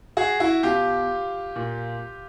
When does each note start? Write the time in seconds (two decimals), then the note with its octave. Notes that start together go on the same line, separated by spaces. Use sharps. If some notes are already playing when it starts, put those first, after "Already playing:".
0.17 F#4 G#4
0.40 E4 F#4
0.63 B2 F4 G4
1.56 A#2